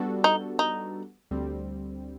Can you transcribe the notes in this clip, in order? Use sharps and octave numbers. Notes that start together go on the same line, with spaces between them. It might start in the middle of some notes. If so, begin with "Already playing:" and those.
Already playing: G3 B3 D4 F#4 A4
D#4
D#4
D2 D3 G3 C4